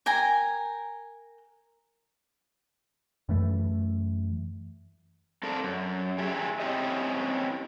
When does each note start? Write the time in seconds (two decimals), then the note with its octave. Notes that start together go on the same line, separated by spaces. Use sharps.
0.06 A#4 G5 G#5 A#5
3.29 F#2 E3 A3
5.43 C4 A4 A#4 D5
5.64 F#2
6.18 G4 G#4 E5
6.60 C4 C#4 E4 G4 D#5